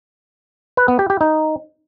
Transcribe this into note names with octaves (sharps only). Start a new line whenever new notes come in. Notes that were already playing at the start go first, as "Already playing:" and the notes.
B4
B3
G4
G4
D#4